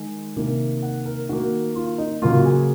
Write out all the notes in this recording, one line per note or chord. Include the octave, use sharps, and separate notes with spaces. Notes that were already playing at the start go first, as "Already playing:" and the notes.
Already playing: D#3 G#3 G#5
C3 D#3 A#3
F#5
A#4
D#3 A#3 F#4
F4
D#4
C#3 F#3 A#3 F4
F#4
G#4